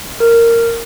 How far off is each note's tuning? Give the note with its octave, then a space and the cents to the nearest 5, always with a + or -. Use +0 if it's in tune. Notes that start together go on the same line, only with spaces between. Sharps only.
A#4 -10